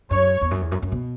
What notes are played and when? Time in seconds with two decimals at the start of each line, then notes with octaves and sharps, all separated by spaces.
0.11 F#2 C#5
0.41 E2
0.51 F#2
0.62 E2
0.71 F#2
0.82 F#2
0.92 B2